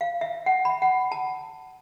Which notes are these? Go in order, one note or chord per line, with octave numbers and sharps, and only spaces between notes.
F5
E5
F#5
B5
F#5
A5